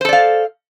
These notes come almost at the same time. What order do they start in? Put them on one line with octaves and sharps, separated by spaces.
C5 A4 D5 F5